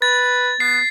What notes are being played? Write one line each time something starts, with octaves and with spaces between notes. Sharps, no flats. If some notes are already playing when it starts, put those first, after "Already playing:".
B4 A6
B3 C7